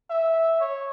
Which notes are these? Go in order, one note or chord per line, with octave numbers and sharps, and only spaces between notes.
E5
C#5